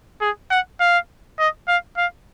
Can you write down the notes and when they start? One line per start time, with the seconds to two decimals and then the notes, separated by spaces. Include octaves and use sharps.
0.21 G#4
0.51 F#5
0.80 F5
1.39 D#5
1.68 F5
1.97 F5